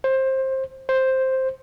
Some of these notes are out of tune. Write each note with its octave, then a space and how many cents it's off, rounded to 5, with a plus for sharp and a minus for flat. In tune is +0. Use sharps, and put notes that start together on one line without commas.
C5 +20
C5 +5